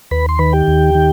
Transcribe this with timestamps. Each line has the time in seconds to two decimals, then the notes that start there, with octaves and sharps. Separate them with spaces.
0.11 D#2 B4 B5
0.29 C6
0.39 D#3 B4 B5
0.53 G4 G5
0.68 D#2
0.95 D#3